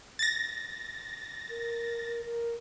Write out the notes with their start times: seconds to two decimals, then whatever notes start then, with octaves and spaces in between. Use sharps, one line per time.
0.19 A6 A#6
1.50 A#4
2.25 A#4